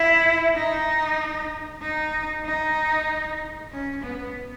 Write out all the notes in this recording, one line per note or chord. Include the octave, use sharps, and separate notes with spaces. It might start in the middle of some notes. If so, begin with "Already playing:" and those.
Already playing: E4
D#4
D#4
D#4
C#4
B3